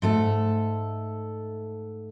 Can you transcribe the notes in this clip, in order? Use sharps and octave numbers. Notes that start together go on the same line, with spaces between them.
G#2 A3 A4